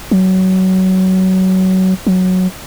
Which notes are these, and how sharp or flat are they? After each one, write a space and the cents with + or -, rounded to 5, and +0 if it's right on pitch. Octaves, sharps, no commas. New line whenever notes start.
F#3 +20
F#3 -5